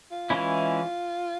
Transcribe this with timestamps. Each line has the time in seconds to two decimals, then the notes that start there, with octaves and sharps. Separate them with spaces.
0.12 F4
0.30 E3 G#3 C#4 E4